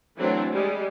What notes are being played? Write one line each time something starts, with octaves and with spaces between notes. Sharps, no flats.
E3 F#3 A3 C4 D4
G3 G#3